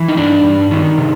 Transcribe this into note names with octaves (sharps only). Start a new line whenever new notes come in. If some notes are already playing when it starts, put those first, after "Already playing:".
Already playing: E3
D#4
G2 D4
G2
D#3
C3